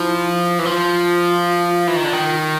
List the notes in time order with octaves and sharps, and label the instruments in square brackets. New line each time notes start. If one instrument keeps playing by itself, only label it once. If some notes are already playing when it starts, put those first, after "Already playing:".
Already playing: [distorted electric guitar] F3 [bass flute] E4
[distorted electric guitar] E3
[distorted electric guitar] F3 [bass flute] F4
[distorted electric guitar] E3
D#3
D3
D#3